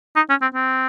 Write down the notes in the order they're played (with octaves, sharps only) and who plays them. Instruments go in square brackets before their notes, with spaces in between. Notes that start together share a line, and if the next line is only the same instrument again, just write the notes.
[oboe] D#4
C#4
C4
C4